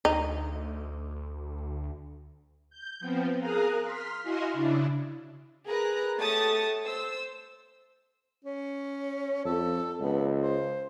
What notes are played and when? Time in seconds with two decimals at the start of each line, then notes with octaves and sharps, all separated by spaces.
0.05 D2 D#4
2.70 G6
3.00 F3 B3 C4
3.39 G#4 A#4 F5 A#5 D#6 F#6
3.80 C6 F6 B6
4.23 E4 F#4 D#5 F5 G#5 C6
4.53 C#3 D4 E4
5.67 G#4 A#4 B4 A#5 F#6
6.18 A3 G4 C#5 A5 D#6 A6
6.82 C5 E6
8.44 C#4
9.45 F2 A4
10.00 C#2 B3
10.40 C5